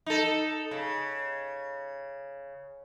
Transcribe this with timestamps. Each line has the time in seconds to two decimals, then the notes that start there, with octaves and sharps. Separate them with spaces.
0.06 D#4 A4
0.71 C#3